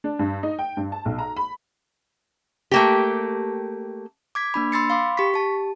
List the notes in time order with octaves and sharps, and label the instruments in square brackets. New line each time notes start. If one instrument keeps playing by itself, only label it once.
[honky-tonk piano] D4
G2
D#4
G5
G2
A5
B1
A#5
B5
[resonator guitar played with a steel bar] A3 A#3 G4
[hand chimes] D6 G#6 B6
A#3 D4 B5
B5 C6 E6 A6 C7 C#7
F5 B5 C6 D6
G4 C#6 B6
G4 A5